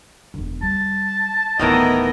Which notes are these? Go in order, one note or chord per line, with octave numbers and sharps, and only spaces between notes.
E1 D3
G3 A5
D1 A2 D#3 E3 B3 F4 A#4 D#5